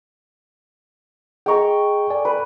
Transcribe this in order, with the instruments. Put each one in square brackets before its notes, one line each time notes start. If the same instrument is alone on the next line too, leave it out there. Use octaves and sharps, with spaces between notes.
[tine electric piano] G#4 D#5 A#5 [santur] G5 C#6
[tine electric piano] A4 D5 G#5
[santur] B4